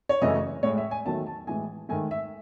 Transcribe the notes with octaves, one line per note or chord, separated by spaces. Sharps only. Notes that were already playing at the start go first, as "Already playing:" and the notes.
C#5
F#2 C#3 E3 A3 D#5
A2 G#3 C#5
E5
G#5
E2 D#3 F#3 A3 A5
A5
A2 E3 G#3 G#5
G#2 D#3 A3 G#5
E5